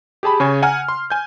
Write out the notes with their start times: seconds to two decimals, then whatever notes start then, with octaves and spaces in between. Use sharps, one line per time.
0.23 G4 G#4 A5 B5
0.40 C#3 C#5 G#5
0.62 F#5 G#5 A#5 F6
0.88 C6
1.10 G#5 G6